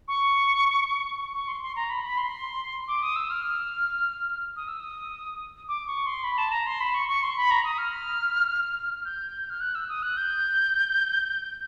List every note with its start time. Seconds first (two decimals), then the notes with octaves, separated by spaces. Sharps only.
0.08 C#6
1.33 C#6
1.48 C6
1.62 C6
1.76 A#5
1.90 B5
2.05 B5
2.18 C6
2.88 D6
3.03 D#6
3.16 E6
3.30 F6
4.56 D#6
4.68 E6
4.80 D#6
5.68 D6
5.87 C#6
6.06 C6
6.24 B5
6.38 A5
6.52 A#5
6.66 C6
6.81 B5
6.94 C#6
7.09 C#6
7.23 C6
7.37 B5
7.51 A#5
7.64 D#6
7.78 F6
9.05 G6
9.50 F6
9.60 F#6
9.75 E6
9.89 D#6
10.03 F#6
10.17 G6